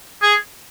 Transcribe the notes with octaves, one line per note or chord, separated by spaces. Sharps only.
G#4